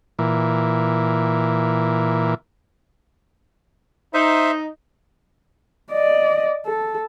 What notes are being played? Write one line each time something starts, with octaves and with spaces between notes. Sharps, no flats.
A#2 E3
D#4 C5 E5
D5 D#5
A4